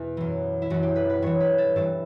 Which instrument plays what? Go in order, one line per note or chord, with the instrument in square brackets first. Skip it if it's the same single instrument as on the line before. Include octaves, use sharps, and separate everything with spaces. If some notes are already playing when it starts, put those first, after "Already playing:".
Already playing: [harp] E2 B2 B4
F#2 E3
E4
F#2 E3 F#4
G4
B4
B4
G2 E3 C#5
B4
A4
G2 E3 A4